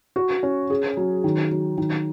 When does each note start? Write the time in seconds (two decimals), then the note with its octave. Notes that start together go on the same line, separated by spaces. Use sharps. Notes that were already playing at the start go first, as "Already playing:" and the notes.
0.16 F#4
0.43 C#4
0.70 G#4
0.97 F#3
1.24 D#3
1.52 F#3
1.78 D#3